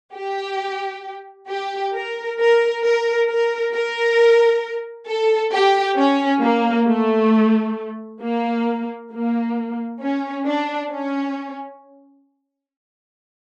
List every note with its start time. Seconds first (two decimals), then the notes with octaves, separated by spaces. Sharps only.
0.15 G4
1.49 G4
1.94 A#4
2.39 A#4
2.84 A#4
3.29 A#4
3.74 A#4
5.08 A4
5.53 G4
5.98 C#4
6.42 A#3
6.87 A3
8.22 A#3
9.12 A#3
10.01 C#4
10.46 D4
10.91 C#4